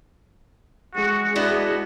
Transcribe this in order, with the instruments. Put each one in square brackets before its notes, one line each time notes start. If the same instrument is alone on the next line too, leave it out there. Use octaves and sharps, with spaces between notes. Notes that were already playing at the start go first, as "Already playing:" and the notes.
[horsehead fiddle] G#3 [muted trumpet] F#4
[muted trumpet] B3 [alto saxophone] D4 [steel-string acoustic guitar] E4 F#4 D#5